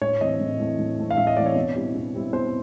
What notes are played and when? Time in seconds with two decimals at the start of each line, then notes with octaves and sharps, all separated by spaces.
0.01 A2 C#5
0.21 E3 A3 C4 D#5
0.40 A2
0.59 E3 A3 C4
0.79 A2
0.98 E3 A3 C4
1.11 F5
1.17 A2 E5
1.27 D#5
1.37 E3 A3 C4 D5
1.46 C#5
1.56 B2
1.75 G3 C4 E4
1.95 B2
2.14 G3 C4 E4
2.33 B2 C5